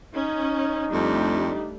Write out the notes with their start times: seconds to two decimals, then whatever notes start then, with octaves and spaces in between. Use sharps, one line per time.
0.15 C#4 D#4
0.92 F2 G3 A3 D4